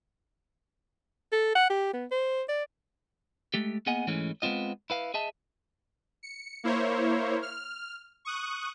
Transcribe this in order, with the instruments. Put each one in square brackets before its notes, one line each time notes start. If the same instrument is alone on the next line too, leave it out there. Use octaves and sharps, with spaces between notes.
[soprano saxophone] A4
F#5
G4
B3
C5
D5
[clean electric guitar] G#3 A3 G4
A#3 B3 G#4 D#5 F#5 G#5
G#2 E3 G#3 A3 C#4
G#3 B3 C4 F4 D#5
E4 B4 F5
G#4 D#5 E5 A5
[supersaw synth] C#7
A#3 E4 C5 C#5
F6
C#6 D#6 F#6